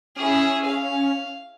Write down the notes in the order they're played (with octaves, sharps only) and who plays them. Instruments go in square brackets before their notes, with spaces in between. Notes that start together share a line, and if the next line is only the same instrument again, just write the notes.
[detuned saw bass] C#4 [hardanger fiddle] E4 G#4
[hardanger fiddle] F5